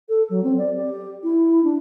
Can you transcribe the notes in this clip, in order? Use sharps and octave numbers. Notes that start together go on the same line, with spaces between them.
A4
F#3
C4
D5
G4
E4
D4